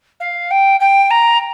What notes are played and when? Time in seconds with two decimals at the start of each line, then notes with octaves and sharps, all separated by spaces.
0.20 F5
0.50 G5
0.80 G5
1.10 A#5